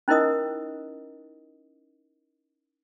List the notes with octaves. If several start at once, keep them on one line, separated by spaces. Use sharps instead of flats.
C#4 D#4 E4 A#4 D#5 D#6